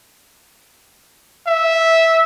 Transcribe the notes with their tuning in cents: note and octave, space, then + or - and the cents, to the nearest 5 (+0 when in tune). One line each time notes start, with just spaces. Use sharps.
E5 -10